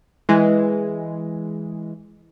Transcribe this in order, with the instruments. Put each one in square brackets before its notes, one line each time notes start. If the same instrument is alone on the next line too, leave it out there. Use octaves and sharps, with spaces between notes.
[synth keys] E3 G#3